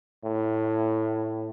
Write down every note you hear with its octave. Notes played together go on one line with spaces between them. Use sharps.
A2